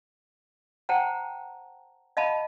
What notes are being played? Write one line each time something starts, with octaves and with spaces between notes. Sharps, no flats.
C5 F#5 G5 A5 A#5
D#5 F5 A5 B5